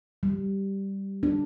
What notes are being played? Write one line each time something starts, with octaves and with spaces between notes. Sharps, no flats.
G3
D4